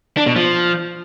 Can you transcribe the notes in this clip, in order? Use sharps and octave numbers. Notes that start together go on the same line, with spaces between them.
D4
B2
F3